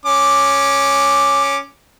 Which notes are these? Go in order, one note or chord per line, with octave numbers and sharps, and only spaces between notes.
C#4 D6